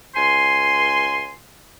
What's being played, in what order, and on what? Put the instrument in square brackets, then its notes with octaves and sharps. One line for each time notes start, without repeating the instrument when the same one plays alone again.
[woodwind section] C#2 G#5 C6